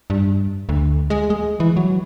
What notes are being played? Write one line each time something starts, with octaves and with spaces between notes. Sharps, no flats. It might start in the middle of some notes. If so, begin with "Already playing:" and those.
G2
D2
G#3
G#3
E3
F#3